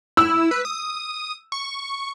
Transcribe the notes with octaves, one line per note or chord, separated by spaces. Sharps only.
E4 E6
B4
D#6
C#6